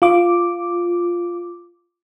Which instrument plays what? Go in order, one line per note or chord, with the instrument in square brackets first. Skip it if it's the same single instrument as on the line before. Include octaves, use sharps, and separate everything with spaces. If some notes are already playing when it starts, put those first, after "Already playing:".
[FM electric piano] F4 D6